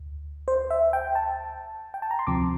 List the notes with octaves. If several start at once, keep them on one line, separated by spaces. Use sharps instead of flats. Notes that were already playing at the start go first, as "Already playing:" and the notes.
Already playing: D2
C5
E5
G5
A5
G5
A5
A#5
C6
D2 C3 F3 C4 D6